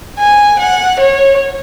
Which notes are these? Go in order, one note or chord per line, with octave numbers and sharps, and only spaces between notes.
G#5
F#5
C#5